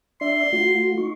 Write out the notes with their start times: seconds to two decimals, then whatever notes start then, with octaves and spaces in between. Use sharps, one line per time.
0.21 D4 D5 E5 C6
0.53 A3 F4 F#4
0.98 D#4 C#6